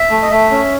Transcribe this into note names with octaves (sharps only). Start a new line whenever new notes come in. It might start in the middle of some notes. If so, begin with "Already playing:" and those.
Already playing: E5
A3
D#5
A3 E5
C#4